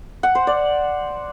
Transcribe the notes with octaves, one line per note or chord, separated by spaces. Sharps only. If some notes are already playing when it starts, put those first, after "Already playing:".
F#5
C5
D5